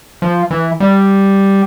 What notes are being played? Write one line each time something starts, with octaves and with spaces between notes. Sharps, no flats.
F3
E3
G3